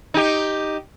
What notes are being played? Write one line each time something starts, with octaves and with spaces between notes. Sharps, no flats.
D#4 G4